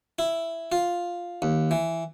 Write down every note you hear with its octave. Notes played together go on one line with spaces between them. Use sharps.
E4
F4
D#2
E3